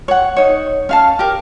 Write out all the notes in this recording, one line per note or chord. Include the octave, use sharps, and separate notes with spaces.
C#5 F#5
D#4 C#5
C#4 F5 A5
G4 A#4